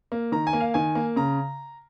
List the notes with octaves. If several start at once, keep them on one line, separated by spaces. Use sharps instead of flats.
A#3
D#3 A#5
G#5
A#3
F5
D#3 G#5
A#3
C#3 A#5